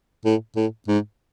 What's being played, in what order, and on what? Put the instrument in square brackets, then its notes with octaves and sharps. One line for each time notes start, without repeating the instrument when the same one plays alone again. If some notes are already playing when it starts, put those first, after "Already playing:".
[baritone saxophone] A2
A2
G#2